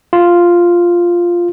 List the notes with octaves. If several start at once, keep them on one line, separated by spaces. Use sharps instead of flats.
F4